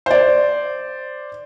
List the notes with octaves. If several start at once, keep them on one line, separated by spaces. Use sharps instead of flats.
C5 D5